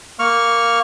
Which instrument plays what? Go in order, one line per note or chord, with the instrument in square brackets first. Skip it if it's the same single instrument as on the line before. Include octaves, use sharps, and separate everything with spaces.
[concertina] A#3 C#6 F6